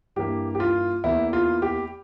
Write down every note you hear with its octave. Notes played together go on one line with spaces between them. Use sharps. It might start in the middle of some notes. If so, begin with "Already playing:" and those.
G2 E3 A#3 G4
G4
F4
E2 E3 A#3 E4
F4
G4